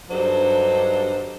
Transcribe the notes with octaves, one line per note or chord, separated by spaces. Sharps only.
G2 F#3 D4 D#4 A4 C5